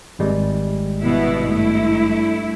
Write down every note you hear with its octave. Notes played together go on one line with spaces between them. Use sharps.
G#1 G3 G#3
B2 B3 E4
G2 A3 E4